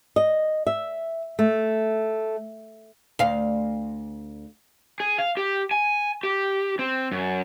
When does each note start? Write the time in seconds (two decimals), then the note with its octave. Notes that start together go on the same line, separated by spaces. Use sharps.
0.16 D#5
0.67 E5
1.39 A3
3.19 D2 F5
5.00 G#4
5.18 F5
5.37 G4
5.71 G#5
6.23 G4
6.79 C4
7.12 F#2